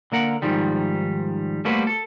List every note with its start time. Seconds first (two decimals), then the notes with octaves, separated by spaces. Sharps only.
0.12 D3 A#3 A#4 F#5
0.42 G#2 D#3 F3 G3
1.65 G3 A3 A#3 F#4 B4 C5
1.87 A4